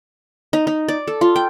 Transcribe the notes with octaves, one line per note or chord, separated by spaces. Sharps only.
D#4
D#4
D5
A4
F4
G5